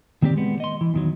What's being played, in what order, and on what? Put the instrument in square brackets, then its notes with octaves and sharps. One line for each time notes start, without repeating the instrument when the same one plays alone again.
[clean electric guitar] D#3 A#3 C4 G4 D5
G#3 B3
D#5 C6
E3
E2 D#3 F#3